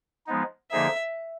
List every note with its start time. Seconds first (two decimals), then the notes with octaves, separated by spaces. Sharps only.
0.27 F3 G#3 B3 D#4
0.71 D3 F3 A#3 D#4 G#4 E5